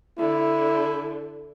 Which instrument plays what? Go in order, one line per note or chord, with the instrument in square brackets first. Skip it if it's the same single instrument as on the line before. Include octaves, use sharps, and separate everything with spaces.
[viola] D3 [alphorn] E4